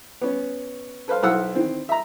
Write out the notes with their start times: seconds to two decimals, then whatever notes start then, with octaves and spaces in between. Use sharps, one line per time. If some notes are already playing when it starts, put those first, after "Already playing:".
0.22 B3 C#4
1.08 A4 B4 C5 F5
1.23 B1 E4 C5 F5 F#5 E6
1.55 D#3 E3 C4
1.89 E5 A#5